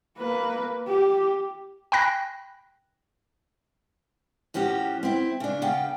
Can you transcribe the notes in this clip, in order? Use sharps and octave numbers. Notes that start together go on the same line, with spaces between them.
A#3 B4
G4
G5 G#5 B5 F#6 A#6
A2 F3 C#4 F#4 G4
C4 E4
C#3 D4
C#3 B3 F5 G5